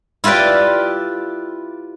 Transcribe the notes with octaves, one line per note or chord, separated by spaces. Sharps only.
E4 F4 G4 B4 D5